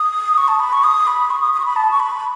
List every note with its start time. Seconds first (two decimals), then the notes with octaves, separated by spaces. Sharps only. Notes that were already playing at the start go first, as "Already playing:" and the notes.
Already playing: D#6
0.38 C#6
0.48 A5
0.60 B5
0.72 C#6
0.84 D#6
1.07 B5
1.30 C#6
1.42 D#6
1.54 D#6
1.60 C#6
1.65 B5
1.76 A5
1.91 C#6
2.00 B5